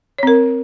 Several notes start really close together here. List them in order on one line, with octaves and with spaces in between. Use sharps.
C#5 C4 A#4